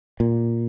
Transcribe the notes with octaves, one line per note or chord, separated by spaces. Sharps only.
A#2